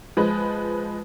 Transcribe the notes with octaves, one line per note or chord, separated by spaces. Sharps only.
F3 G#3 B4